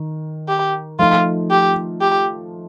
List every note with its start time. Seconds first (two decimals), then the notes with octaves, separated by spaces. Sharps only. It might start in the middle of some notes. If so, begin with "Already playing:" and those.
Already playing: D#3
0.48 G4
0.99 F3 A3 D#4 F4
1.51 G4
2.01 G4